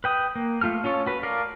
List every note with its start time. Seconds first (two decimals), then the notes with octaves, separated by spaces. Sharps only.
0.04 B4 G5 D#6
0.35 A#3
0.61 A3 F4 A4 F6
0.84 C#4 F4 A4 C#5
1.06 F#4 B4
1.23 A4 A#4 D5 F5